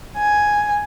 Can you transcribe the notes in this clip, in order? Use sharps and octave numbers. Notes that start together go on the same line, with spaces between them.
G#5